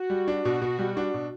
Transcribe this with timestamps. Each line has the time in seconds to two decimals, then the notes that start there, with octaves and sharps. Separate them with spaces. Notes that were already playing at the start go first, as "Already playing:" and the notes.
Already playing: F#4
0.10 G3
0.28 D4
0.45 B2 F#4
0.62 B2
0.79 G3
0.97 D4
1.14 B2